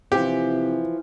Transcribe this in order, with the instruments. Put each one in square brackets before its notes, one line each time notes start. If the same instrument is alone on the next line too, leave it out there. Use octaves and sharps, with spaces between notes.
[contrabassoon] C3 [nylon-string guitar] E3 F3 [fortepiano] G4